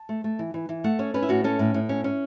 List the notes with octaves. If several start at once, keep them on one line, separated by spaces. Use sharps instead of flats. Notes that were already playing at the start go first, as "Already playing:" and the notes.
Already playing: A5
A3
A3
E3
E3
E3
A3 F#5
C#4 C#5
C#4 B4
E4
A2 F#4
C#4 A4
A2
A2
C#4
C#4